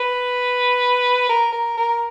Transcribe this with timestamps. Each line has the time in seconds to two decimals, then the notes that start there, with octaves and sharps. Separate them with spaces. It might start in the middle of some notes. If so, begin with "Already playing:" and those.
Already playing: B4
1.29 A#4
1.53 A#4
1.77 A#4